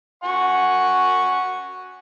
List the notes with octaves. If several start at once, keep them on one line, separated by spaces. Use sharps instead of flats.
F#5 G#5 C#6